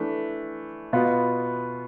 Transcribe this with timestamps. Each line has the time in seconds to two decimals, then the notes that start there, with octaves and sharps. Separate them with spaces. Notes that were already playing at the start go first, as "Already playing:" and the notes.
Already playing: E3 A3 D4
0.93 B2 B3 F4